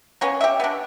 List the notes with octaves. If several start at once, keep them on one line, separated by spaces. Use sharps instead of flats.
A#3 B3 C#4
G4 E5
B3 D4